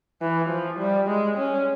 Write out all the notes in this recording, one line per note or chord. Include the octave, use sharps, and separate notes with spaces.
E3
F3
G3
G#3
C#4